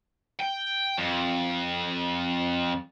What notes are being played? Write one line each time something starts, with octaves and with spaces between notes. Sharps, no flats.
G5
F2